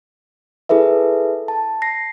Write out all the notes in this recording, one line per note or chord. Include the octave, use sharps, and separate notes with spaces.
E4 G#4 A4 B4 E5
A5
A#6 C7